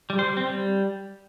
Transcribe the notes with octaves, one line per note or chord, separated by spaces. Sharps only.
G3
C5
G3
C4
G3